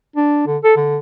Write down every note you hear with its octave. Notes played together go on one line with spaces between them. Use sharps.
D4
D3
A4
D3